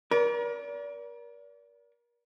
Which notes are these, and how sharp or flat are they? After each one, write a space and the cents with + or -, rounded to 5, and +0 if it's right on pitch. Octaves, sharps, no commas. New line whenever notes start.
A#4 +35 D5 -30